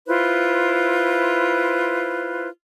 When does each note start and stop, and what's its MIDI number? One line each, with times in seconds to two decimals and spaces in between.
0.06 2.47 64
0.06 2.47 65
0.06 2.47 71
0.06 2.47 72